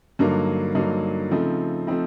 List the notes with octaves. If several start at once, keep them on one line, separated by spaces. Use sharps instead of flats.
G2 D3 F#3 A#3 D#4
G2 D3 F#3 A#3 D#4
C#3 F3 A3 C4 D#4
F3 A3 C4 D#4